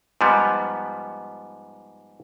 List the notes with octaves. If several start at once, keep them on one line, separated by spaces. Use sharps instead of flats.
G#2 F3 G3 B3